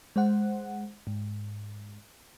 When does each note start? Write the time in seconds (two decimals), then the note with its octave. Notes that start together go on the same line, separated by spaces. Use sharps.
0.16 G#3 C5 F#5
1.07 G#2